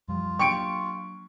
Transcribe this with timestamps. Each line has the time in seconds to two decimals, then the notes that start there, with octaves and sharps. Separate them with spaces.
0.08 F#2 F3 G3 F4
0.39 F#3 A#3 D4 G4 C#6 C#7 D7